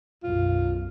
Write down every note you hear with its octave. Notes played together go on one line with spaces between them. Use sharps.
B1 F#2 F4